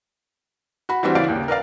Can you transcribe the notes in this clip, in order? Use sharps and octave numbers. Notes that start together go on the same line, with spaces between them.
F#4 B5
E3 G3 C4 D4 F#4
C#3 E3 C#4 D5 F5 D7
D#2 C#3
A#4 B4 D5 F5